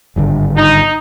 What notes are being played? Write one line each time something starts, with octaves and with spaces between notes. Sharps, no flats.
G#1 G2 D3
D#4